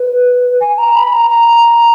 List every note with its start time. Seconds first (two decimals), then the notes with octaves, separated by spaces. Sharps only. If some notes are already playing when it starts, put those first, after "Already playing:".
Already playing: B4
0.61 G#5
0.78 A#5
0.96 B5
1.13 A#5
1.30 A#5